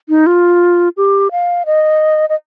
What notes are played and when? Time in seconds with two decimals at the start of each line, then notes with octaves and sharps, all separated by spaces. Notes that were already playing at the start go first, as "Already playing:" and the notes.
0.09 D#4
0.26 F4
0.97 G4
1.32 F5
1.66 D#5
2.29 D#5